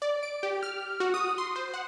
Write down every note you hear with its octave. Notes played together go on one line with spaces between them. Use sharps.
D5
D7
G4
F6
F#4
D#6
C6
C5
F#5